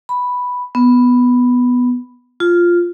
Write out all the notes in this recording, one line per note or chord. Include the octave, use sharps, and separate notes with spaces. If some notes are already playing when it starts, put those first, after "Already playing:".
B5
B3
F4